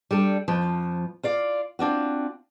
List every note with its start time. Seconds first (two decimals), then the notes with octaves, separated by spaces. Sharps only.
0.11 G3 D4 A4
0.48 F2 F3
1.23 F4 D5 F5
1.79 C4 D4 F4 F#4